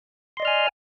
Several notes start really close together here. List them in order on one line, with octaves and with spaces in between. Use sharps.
C6 D#5 D5 F6 G#5